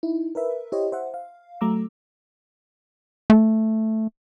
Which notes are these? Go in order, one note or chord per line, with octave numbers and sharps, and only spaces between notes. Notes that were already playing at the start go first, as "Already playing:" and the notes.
D#4 E4
A#4 B4 E5
E4 G4 C5 C#5 D#5
C5 E5 F#5
F5
F#3 A3 A#5 D6 E6
A3